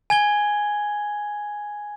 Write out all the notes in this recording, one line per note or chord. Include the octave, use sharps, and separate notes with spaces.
G#5 G#6 G7